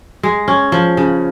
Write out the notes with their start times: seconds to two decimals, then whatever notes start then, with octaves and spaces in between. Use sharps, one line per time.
0.23 G#3
0.48 C#4
0.72 F3
0.97 C#3